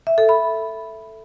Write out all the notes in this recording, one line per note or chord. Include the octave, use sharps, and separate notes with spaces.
E5
A4
B5